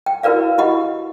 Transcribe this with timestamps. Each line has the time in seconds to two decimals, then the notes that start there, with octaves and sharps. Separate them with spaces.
0.06 G5
0.23 E4 F#4 A#4 B4 D5 F5
0.58 E4 F#4 G4 D#5 F#5 B5